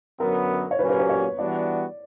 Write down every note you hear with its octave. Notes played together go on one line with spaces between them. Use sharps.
F#2 D3 F#3 B3 A#4
C#5
A#2 F#3 A#3 C#4 G4 B4
B4
B4
C#5
E3 G3 B3 D4 F#4 D5